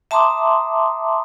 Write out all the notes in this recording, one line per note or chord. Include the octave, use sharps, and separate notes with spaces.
E5 A5 A#5 C6 D6 D#6